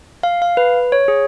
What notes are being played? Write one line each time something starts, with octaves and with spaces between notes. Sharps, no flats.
F5
F5
B4
C#5
G#4